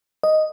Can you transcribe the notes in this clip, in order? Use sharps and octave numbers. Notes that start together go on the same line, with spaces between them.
D#5